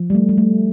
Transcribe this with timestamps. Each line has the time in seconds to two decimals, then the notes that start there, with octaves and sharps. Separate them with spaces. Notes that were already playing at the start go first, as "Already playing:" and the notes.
Already playing: F3
0.10 G3
0.15 A3
0.29 G3
0.38 A3